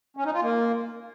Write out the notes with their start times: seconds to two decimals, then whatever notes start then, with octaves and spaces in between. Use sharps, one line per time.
0.17 C#4
0.25 D#4
0.34 F4
0.42 A#3